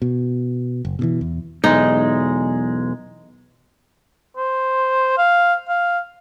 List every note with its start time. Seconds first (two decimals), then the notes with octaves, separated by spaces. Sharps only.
0.02 B2
0.85 F#1
0.99 B2 D3 E3
1.21 E2
1.64 B1 E2 G#3 D#4
4.37 C5
5.18 F5
5.68 F5